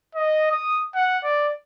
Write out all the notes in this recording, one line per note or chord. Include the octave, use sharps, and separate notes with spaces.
D#5
D#6
F#5
D5